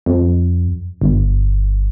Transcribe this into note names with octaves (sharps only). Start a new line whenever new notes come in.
F2
G1